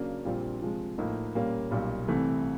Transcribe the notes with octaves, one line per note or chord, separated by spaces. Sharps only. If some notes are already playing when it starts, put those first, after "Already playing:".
Already playing: C#3 F#3 A#3 D4
A#1 A#2 G3 C4 F4
C3 F3 G#3
A2 F3 A#3 D#4
A#2 G3 A#3 C#4
B1 A#2 G3
C2 C3 E3 A3